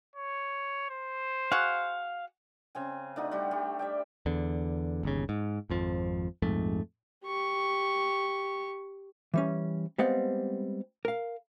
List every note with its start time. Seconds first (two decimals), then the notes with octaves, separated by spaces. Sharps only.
0.16 C#5
0.90 C5
1.52 F#4 G#4 F5 F#5
2.75 C#3 C4 G#5
3.16 A3 D4 D#4 F#4
3.31 G3 F#4 G4
3.51 G3
3.79 D5 E5 G5
4.26 E2 D3
5.03 G1 D#2 C#3
5.29 G#2
5.70 G#1 F2 F3
6.42 A#1 F2 G#2 A3
7.25 G4 C#6
9.34 E3 G3 C#4
9.98 G3 G#3 B3 C4 F5 F#5
11.05 A#4 F5